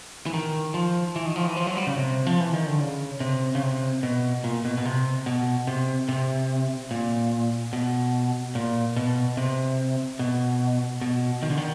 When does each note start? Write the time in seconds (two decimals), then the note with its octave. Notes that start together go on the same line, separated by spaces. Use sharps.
0.26 E3
0.34 D#3
0.74 F3
1.16 E3
1.26 D#3
1.36 F3
1.46 E3
1.57 F3
1.67 F#3
1.77 G3
1.87 C#3
1.98 C3
2.27 F3
2.40 E3
2.53 D#3
2.66 D3
2.80 C#3
3.20 C3
3.55 C#3
3.62 C3
4.03 B2
4.44 A#2
4.65 B2
4.78 B2
4.85 C3
5.26 B2
5.67 C3
6.09 C3
6.91 A#2
7.73 B2
8.55 A#2
8.96 B2
9.37 C3
10.19 B2
11.01 B2
11.43 D#3
11.50 D3
11.57 D#3